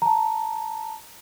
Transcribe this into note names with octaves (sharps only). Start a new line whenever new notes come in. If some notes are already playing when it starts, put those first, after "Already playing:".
A5 A#5